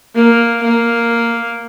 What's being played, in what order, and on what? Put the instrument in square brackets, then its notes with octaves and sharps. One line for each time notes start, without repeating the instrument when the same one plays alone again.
[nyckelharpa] A#3
A#3